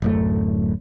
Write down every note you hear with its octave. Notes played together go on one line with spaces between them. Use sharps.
D1 F#2 A3